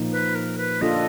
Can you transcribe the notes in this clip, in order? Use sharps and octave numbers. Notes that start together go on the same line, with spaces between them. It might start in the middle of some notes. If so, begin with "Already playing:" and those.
Already playing: A#2 F3 A#3 D#4
B4
A#4
B4
A#3 D4 F4 A4 D#5